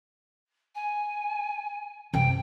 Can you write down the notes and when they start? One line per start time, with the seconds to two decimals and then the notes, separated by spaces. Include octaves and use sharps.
0.75 G#5
2.14 F#2 C3 G5